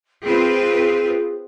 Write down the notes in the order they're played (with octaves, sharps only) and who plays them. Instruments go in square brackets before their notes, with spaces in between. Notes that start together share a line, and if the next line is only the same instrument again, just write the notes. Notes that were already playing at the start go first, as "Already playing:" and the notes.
[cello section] C4 F4 B4 [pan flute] G#4